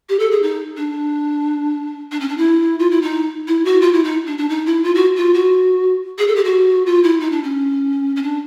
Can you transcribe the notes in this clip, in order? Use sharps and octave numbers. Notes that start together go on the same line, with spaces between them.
G4
A4
G#4
D#4
D4
D4
C#4
D4
E4
F4
E4
D#4
E4
F#4
F4
E4
D#4
D4
D4
D#4
E4
F4
F#4
F4
F#4
G#4
A4
G4
F#4
F4
E4
D#4
D4
C#4
C#4
D4